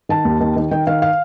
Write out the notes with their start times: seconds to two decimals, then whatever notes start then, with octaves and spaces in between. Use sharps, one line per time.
0.09 D#3 A5
0.25 D#2
0.40 D#3
0.56 D#3
0.71 D#3 G5
0.87 D#3 F5
1.02 F5